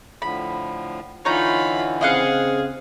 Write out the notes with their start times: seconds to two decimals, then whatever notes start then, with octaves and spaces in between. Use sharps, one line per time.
0.22 A2 D3 F3 B5
1.25 D3 E3 D#4 F4 C#5 B5
2.01 C#3 C4 G#4 D#5 F5 F#5